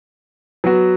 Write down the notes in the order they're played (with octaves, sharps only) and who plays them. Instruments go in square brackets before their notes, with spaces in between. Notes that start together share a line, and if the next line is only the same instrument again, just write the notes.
[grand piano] F#3 B3 F#4